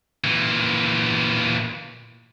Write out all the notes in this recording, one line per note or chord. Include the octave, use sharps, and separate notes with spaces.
A#2 E3